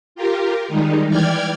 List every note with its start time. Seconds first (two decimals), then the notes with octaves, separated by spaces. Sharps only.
0.15 F4 G4 A#4
0.68 D#3 G3 G#3 D#4
1.08 E3 D5 G5 F6 G#6